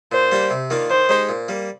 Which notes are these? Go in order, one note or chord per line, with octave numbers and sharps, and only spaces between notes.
A#2 C5
G3 A#3 D4 G4
C3
D#3 A#3 D4 F4
D#3 C5
G#3 D#4 G4
A#2
G3 A#3